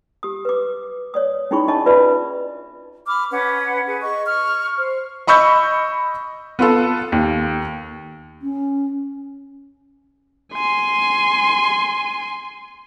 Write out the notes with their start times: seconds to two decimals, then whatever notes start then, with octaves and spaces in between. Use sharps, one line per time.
0.23 G4 D#6
0.45 B4 D6
1.14 C#5 D5 D#6
1.51 C#4 D#4 E4 G#4 B5 C#6
1.68 D4 D#5 E5 A5 C#6
1.86 F4 B4 D5 E5 B5
3.06 B5 D6 F6
3.31 C#4 B4 F#5
3.86 G#4 B4
4.01 D#5 C#6
4.27 C#6 F6
4.77 C5
5.27 D#5 B5 C#6 E6 G6
6.59 B3 F4 A4
7.12 D#2
8.42 C#4
10.53 G#5 C6